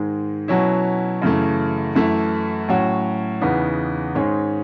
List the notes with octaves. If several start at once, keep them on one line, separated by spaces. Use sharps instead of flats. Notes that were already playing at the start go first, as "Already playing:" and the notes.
Already playing: G#2 D#3 G#3
B2 F#3 C#4 E4
F#2 C#3 E3 A3
F#2 E3 A3 E4
A2 F#3 C#4 F#4
E2 C#3 E3 B3 D#4
G#2 D#3 G#3 C#4